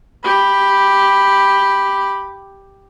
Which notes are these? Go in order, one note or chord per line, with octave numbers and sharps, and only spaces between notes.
G4 B5